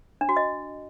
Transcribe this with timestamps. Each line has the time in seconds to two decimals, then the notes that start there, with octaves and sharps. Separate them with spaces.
0.21 D4
0.29 F#4
0.37 D#5